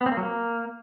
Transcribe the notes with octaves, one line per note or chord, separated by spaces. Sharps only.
B3
C4
A#3
F#3
A#3